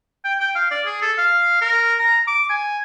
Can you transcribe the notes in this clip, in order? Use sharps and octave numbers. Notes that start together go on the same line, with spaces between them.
G5
G5
F5
D5
G#4
A4
F5
A#4
A#5
D6
G#5